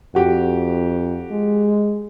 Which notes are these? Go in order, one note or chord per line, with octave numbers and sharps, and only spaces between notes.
F2 F#4 G4
G#3